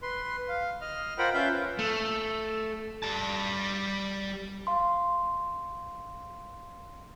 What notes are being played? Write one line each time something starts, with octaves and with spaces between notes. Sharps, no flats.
B4 C6
F5
D#5 F6
F4 A#4 C5 F#5 G5 B5
C#4 F4 B4 E5 F5 G6
A3
G3 A5
F5 C6